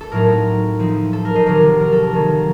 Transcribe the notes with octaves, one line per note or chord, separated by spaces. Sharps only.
A4
A2 F#3 C4 D#4 A#4
F3 C4 D#4
A4
A#4
C5 D#5
C3 D#3 F#3 C4 A#4
A#4
A4
A#4
D#3 F#3 A#3 D#4